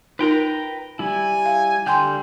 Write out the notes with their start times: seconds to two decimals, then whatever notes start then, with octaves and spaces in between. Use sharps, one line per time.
0.19 D#4 F4 A#4 B4 G5 A#5
0.99 G3 E4 G#5
1.46 F5
1.86 D3 G3 G5 G#5 C6 G6